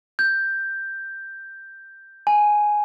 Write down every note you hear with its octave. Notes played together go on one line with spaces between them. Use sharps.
G6
G#5